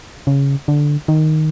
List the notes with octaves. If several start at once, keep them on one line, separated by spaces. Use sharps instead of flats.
C#3
D3
D#3